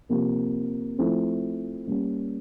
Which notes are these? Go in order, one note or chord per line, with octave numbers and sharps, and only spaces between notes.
C3 F3 A#3
F3 A3 C4 E4
G3 A#3 C#4